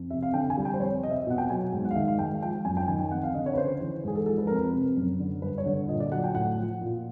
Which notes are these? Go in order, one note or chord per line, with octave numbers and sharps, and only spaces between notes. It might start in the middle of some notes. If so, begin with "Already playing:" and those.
Already playing: F2
C3 E5
F5
D3 G5
G#5
G3
G5
C5
F2 C#5
C3 D#5
E5
B2 F#5
G5
F#3 G#5
G#2
F#5
F5
D#3 E5
F5
G#2 G5
F3 G5
F#2 G#5
G5
D#3 G#5
G5
F2 F#5
F5
D3 D#5
C#5
B4
C#3 C5
E3
G#2 G#4
A4
F3 A4
B4
F2 A#4
B4
C3
F#2
D3
G2 B4
C#5
D3
A#2 D#5
D5
F#3 F#5
G5
A2 F#5
F3
A#2